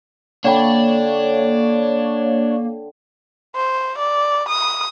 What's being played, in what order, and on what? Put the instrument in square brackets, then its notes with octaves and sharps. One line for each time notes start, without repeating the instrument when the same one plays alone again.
[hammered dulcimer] D3 G5 B5 [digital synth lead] A#3 [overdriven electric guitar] D4 [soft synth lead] C#5
[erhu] C5
D5
D#6